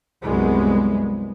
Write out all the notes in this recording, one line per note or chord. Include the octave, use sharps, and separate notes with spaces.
C2 F#2 G#3 B3